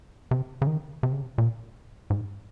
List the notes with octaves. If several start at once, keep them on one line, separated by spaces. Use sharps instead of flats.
C3
C#3
D#3
C3
C#3
C3
A#2
G#2